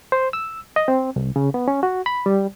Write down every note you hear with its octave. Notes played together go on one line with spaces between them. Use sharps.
C5
E6
D#5
C4
C2
C#3
B3
C#4
F#4
B5
G3